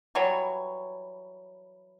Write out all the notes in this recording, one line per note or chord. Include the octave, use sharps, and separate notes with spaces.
E3 F#3 G3 C#5